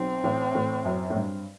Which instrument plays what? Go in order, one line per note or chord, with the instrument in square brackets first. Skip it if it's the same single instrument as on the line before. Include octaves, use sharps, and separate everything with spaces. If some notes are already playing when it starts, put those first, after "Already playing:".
Already playing: [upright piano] B1 [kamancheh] C4
[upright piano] A1 A2
A1 A2
F#2
A2
G2